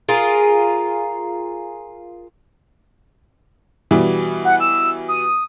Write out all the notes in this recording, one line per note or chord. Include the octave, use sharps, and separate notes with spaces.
F4 G#4 A#4
B2 E3 G3
F#5
E6
D#6